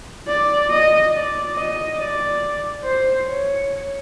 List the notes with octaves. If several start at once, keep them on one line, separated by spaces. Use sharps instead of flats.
D5
D#5
D5
D#5
D5
C5
C#5